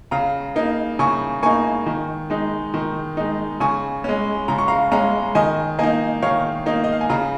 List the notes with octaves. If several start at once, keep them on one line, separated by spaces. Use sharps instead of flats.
C#3 F5 A#5
A#3 D#4
C#3 G#5 C#6
A#3 D#4 G#5 C#6
D#3
G#3 D#4
D#3
G#3 D#4
C#3 G#5 C#6
G#3 C#4
C#3 A#5
C#6
F5 A#5
G#3 C#4 F5 A#5
D#3 D#5 G#5
A#3 D#4 D#5 G#5
D#3 C#5 F5
A#3 D#4
D#5
F5
G#5
C#3 F5 A#5